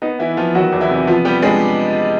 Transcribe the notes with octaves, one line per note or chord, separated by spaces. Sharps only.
B3 D#4
E3 B3 E4
F3 B3 F4
D#3 F#3 F#4
E2
E3 E4
C3
F3 B3 F4
G3 B3 G4
G#3 D4 G#4